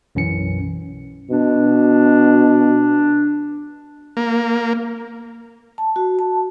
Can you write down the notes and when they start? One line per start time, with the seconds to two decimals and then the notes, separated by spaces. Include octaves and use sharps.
0.15 B1 F#2 E3 C#4 C#7
1.31 B2 D4
4.17 A#3
5.78 A5
5.96 F#4
6.19 A5